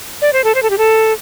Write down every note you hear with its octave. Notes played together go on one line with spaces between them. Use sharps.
D5
C5
A4
C5
A4
G4
A4